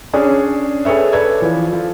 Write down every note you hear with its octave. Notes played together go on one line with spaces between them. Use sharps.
C#4 D4 G#4
G#4 A4 B4 C#5 E5
A4 B4 D5 G#6
E3 F3
F3